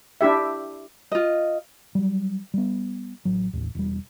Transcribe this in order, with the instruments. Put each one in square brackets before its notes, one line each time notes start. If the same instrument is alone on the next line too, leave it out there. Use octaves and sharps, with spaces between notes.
[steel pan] D4 E4 G4 E5
[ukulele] F4 D#5
[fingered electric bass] F#3 G3
G3 B3
A1 F#3
A1 D#2
E1 G3